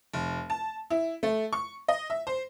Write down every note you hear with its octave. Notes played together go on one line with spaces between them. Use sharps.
F1
A5
E4
A3
C#6
D#5
E5
C5